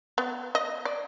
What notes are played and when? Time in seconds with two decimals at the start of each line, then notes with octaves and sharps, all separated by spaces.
0.18 B3
0.55 D#5
0.85 D5